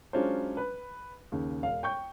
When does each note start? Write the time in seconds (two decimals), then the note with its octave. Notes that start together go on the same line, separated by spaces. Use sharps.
0.13 F#3 G#3 C#4 D4 F4 C5
0.57 B4
1.32 D#2 C#3
1.62 E1 F5
1.83 G5 C#6 G6